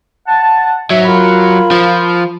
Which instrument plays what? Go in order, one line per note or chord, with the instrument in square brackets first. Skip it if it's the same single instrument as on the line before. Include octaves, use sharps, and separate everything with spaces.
[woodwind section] F#5 A5
[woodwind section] G#2 E5 [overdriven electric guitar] F#3
[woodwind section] F4 A#4 B5
[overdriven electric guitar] F3